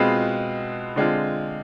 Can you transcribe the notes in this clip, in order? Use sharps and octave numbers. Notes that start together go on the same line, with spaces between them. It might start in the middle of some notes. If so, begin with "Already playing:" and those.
Already playing: B2 G#3 C4 F4 B4
D3 G#3 C4 F4